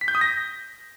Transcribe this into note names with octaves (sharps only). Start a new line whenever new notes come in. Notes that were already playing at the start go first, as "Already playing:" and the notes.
B6
G6
D#6
A#6